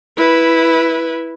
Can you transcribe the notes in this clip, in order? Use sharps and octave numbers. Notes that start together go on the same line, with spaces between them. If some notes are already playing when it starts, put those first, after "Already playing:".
E4 B4